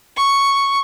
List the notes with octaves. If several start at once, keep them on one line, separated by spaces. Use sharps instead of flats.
C#6